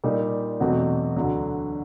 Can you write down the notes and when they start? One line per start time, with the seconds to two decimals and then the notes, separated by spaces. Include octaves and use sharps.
0.04 A#2 G3 A#3 D#4 G4
0.60 E2 B2 F#3 A3 C4
1.16 D2 D3 F#3